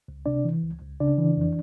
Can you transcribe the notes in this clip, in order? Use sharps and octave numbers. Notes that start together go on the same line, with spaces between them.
C#2
C3 D4 D5
E3
C#2
C#2
C#3 D4 D5
E3
F2